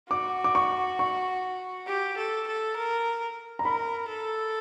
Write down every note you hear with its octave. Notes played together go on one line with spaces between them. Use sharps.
F#4 D6
D6
C#6
C#6
G4
A4
A4
A#4
A#5
A#4 B5
A4